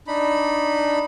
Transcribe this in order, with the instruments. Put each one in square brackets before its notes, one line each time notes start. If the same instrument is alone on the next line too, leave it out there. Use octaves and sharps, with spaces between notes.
[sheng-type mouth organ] D4 D#4 B5